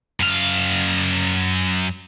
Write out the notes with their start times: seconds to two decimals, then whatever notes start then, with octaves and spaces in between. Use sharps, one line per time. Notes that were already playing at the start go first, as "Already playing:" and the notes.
0.20 F#2 F5